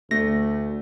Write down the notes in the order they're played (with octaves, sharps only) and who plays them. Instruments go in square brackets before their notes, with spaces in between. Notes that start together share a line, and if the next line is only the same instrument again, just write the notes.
[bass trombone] D2 [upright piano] A3 [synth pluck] A#6